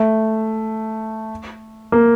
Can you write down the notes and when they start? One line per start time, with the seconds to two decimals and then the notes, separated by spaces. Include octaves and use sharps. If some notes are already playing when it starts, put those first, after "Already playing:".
Already playing: A3
1.92 A#3